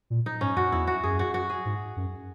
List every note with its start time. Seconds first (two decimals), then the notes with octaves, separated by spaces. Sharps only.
0.10 A#2
0.26 D#4
0.41 G#2 C#4
0.57 F#2 F#4
0.72 E2 E4
0.87 F#4
1.03 F#2 G#4
1.19 F#4
1.34 F#4
1.50 G#4
1.65 G#2
1.96 F#2